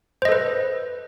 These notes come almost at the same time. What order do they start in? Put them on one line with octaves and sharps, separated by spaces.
C5 D#5 A4 B4